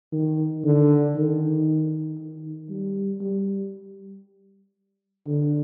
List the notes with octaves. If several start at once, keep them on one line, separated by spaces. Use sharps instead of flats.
D#3
D3
D#3
D#3
G3
G3
D3